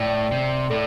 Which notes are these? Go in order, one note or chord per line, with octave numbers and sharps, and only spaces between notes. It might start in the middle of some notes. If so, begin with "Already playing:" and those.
Already playing: A2 D5 G5
C3
A2 A4 D5